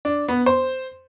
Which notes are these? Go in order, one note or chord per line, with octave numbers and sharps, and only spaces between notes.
D4
B3
C5